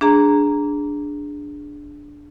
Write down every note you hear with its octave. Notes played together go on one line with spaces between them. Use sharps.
D4 G#4 A#5